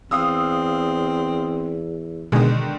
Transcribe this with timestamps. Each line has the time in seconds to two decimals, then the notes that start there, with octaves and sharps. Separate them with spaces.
0.11 E2 C4 F5 D#6 E6
2.32 B2 D3 D#3 G#3